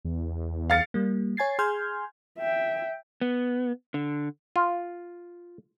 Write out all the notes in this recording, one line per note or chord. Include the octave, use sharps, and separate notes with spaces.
E2
F5 A6 C#7
G3 A#3
C#5 G#5 G#6 A6 C7
G#4 G#5 C6 F6 G6 G#6
E5 G5
B3
D3
F4